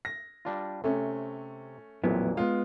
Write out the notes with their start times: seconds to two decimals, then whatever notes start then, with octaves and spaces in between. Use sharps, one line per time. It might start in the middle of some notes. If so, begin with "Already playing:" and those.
0.05 A#6
0.45 G3 D4 F4
0.84 C3 A3 C#4
2.04 A1 F2 A#2 F#3 B3 E4
2.37 G#3 B3 F4